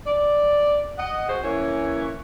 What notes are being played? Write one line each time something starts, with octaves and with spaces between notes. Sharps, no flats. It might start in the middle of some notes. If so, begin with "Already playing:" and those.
D5
D#5 F#5
C4 F#4 G#4 C5
E3 A#3 C#4 C#5